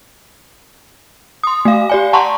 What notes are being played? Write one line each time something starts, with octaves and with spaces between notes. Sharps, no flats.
C6 D#6
A3 F5
G4 D5 G#5
F#5 A5 A#5 C6 C#6